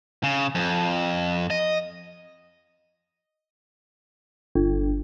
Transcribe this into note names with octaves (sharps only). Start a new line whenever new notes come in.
C#3
F2
D#5
G1